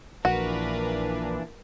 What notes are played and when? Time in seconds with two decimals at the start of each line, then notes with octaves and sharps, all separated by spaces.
0.25 A#1 A#2 E3 D4 F#4 A#4 B4